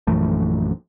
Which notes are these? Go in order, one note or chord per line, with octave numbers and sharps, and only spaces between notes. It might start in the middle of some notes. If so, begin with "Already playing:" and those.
A#1 F#2 E3 A3